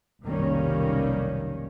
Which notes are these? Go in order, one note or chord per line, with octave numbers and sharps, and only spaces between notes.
F1 B1 D#3 G3 A#3 C#4